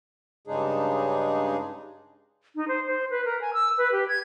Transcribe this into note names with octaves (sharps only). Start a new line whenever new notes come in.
G2 C#3 G#3 D4 D#4 G#4
D#4
C5
C5
B4
A#4
G#5
E6
B4
G4
G#6